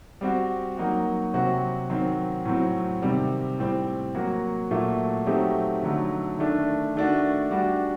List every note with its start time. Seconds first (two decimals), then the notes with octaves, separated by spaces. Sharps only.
0.21 G3 C4 F#4
0.77 F#3 A#3 D#4 F#4
1.34 C3 F#3 C4 F#4
1.90 D#3 F#3 C4
2.45 A2 F#3 C4
3.02 C3 D#3 G3 C4
3.59 A2 G3 C4
4.15 F#3 A#3 F#4
4.71 A#2 F#3 A3
5.27 F#3 A3 C4 D#4 G4
5.83 D3 F#3 A3 D#4
6.38 D#3 A3 D4
6.95 D#3 A3 D4 F#4
7.51 G3 D4 F#4